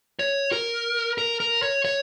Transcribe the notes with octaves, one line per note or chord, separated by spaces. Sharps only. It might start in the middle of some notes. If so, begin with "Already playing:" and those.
C#5
A#4
A#4
A#4
C#5
C#5